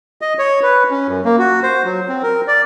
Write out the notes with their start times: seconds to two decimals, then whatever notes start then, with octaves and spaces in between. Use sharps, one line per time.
0.21 D#5
0.39 C#5
0.63 B4
0.90 C#4
1.08 F#2
1.25 A#3
1.39 F#4
1.63 C5
1.85 F#3
2.09 C4
2.23 A#4
2.48 D5